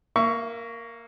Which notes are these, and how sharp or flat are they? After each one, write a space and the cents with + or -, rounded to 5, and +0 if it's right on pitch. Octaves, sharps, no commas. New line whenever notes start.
A#3 +0 E5 +35 C#6 +20